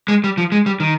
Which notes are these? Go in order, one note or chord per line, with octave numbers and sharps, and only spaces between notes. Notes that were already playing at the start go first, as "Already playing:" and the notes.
G#3
G3
F3
G#3
G3
D#3